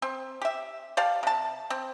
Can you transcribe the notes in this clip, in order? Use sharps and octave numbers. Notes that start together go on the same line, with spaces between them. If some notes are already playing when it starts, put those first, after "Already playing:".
C4
G4 E5
G4 D5 F5 A5
C3 A5
C4